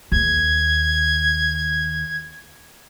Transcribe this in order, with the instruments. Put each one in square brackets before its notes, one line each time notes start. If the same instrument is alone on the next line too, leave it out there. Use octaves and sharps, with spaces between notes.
[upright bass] D#2 [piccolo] G#6